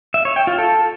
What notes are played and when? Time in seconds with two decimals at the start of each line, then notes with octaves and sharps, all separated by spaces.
0.14 E5
0.25 C#5
0.36 G5
0.47 F4
0.58 A4